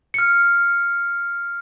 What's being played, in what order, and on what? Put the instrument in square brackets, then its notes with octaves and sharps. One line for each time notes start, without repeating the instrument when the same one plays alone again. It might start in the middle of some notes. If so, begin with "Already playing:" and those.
[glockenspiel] F6 C#7